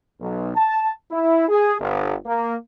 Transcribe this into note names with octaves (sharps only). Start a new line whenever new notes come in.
B1
A5
E4
G#4
G1
A#3